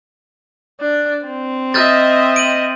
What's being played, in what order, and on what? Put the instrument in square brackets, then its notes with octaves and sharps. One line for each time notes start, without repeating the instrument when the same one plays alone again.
[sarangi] D4
C4
[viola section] D#5 E5 [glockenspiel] F6 G6 A6
[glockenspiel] D7 D#7 F#7